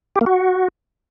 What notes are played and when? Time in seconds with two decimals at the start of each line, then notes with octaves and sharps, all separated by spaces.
0.16 G4
0.21 A#3
0.26 F#4